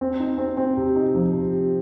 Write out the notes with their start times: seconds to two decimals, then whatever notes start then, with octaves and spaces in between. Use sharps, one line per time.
0.01 C4
0.20 D#4
0.38 C4
0.57 C4
0.77 C3
0.96 D#4
1.15 F3
1.33 C3
1.52 C3